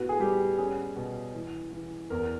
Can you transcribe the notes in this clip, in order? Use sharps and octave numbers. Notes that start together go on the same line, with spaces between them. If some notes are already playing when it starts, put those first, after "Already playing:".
Already playing: A2 B3 F#4
G#4
G3 G4
C#4 G#4
B2
E3
E3
E2 A#4